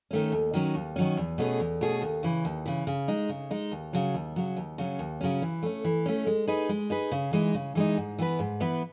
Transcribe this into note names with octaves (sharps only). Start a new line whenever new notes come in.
D#3 A3 C#4
D#2
D#3 F#3 C#4
D#2
D#3 F#3 C#4
E2
B2 A3 C#4 G#4
E2
B2 A3 C#4 G#4
D#2
C#3 E3
D#2
C#3 E3
C#3
G#3 D#4
C#3
G#3 D#4
D#2
C#3 F#3
D#2
C#3 F#3
D#2
C#3 F#3 C#4
D#2
C#3 F#3 C#4
E3
A3 C#4
E3
A3 C#4
G#3
D#4 G#4 B4
G#3
D#4 G#4 B4
C#3
E3 G#3 D#4
C#3
E3 G#3 D#4
G#2
E3 B3 E4 B4
G#2
E3 B3 E4 B4